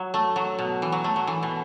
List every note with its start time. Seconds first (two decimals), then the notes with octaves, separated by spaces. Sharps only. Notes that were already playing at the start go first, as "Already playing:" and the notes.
Already playing: F#3
0.14 A3
0.36 F#3
0.59 B2
0.82 E3
0.92 F#3
1.04 A3
1.16 F#3
1.27 E3
1.43 B2